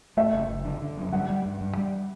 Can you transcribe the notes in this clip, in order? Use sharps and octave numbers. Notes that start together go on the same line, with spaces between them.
A3 E5
F#1
F#1
D3
D3
F#2
G3 F#5
G3
G2
G2
G3